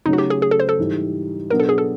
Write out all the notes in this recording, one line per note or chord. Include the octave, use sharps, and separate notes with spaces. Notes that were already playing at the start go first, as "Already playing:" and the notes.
C#3 F#3 A3 C#4 D#4
F#4
G4
G#4
G#4
A4
C5
A4
G#2 E3 G3
B2 F#3 B3 D4 A#4
A4
G#4
A4